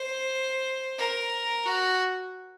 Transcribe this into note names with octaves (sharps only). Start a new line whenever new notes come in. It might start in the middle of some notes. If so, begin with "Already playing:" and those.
Already playing: C5
A#4
F#4